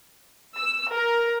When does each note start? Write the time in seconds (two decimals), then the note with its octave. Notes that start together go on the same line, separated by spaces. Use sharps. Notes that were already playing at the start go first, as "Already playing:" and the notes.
0.57 E6
0.93 A#4